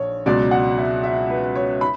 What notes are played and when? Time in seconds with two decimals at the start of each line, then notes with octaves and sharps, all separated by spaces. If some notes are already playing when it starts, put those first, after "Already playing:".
Already playing: A#1 C#5
0.26 C#2 B2 F#3 D5
0.51 F#5
0.78 E5
1.03 E5
1.30 B4
1.55 C#5
1.81 B5